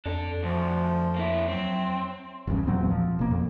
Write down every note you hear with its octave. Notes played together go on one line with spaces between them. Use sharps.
F2 D4 A4
D2 F3
A#3 E4
F#3 C4
E1 C#2 G2 C#3
E2 A#2 F#3 C4
F3
E1 B2 A#3
F2